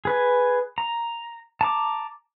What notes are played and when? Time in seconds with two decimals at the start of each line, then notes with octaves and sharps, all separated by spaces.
0.05 G#4 B4 G#5
0.78 A#5
1.61 A5 A#5 D6